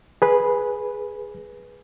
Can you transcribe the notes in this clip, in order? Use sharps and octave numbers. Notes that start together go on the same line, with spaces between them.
G#4 B4